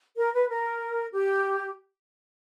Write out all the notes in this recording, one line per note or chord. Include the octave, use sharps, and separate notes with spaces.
A#4
B4
A#4
G4